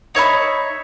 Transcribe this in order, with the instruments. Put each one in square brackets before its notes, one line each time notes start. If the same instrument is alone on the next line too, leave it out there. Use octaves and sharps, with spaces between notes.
[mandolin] D#4 C#5 E5 B5